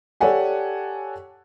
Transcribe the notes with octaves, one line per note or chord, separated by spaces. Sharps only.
G4 A4 C#5 D5 F#5 G#5